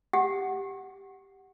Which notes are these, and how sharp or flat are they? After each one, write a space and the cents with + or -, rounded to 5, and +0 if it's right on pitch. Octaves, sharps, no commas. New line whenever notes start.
G4 +0 F#5 +5